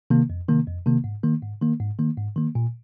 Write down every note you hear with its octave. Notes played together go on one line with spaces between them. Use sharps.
C3 D#3 A#3
F2
C3 D#3 A#3
F2
C3 D#3 A#3
G#2
D#3 A#3
G#2
D#3 A#3
G#2
D#3 A#3
G#2
D#3 A#3
A#2